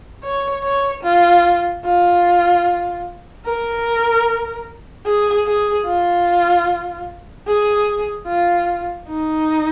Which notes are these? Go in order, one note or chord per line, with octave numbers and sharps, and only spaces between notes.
C#5
C#5
F4
F4
A#4
G#4
G#4
F4
G#4
F4
D#4